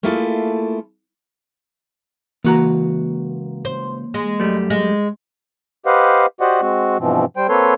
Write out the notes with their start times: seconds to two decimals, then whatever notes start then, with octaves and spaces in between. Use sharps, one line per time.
0.03 A3 A#3 E4 F4 G#4 A4
2.44 C#2 E3 A#3 F#4 A#5
3.65 C5
4.14 G#3
4.40 F#2 G3 A3
4.70 G#3
5.86 G4 B4 C5 D#5 F5 F#5
6.41 F#4 G4 C5 D5 D#5 F#5
6.61 G#3 C4 F#4
6.99 G2 B2 E3 F3 C4
7.37 G3 C5 G5
7.49 A#3 C4 A4 B4 C#5 C6